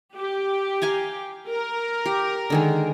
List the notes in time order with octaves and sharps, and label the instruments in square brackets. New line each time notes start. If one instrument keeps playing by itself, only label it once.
[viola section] G4
[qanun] F5 G#5 A#5
[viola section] A#4
[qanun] G4
D3 D#3 G#3